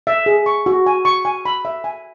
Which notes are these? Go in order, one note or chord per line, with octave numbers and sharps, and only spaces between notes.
E5
G#4
C#6
F#4
G#5
C#6
G#5
B5
E5
G#5